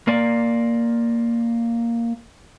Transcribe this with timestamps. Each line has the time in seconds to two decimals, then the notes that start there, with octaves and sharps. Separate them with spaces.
0.08 A#3 D5